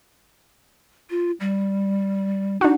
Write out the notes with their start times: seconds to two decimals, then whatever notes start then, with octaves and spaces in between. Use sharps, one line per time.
1.10 F4
1.40 G3
2.61 D4 D#4 F#4